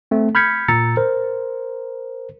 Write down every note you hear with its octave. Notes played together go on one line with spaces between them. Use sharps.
A3 C4
B5 F6 G6 G#6 B6 C#7
A#2 A#5 E6 A6 C#7
A#4 C5